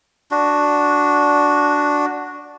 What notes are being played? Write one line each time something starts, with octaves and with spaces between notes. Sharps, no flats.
D4 F#4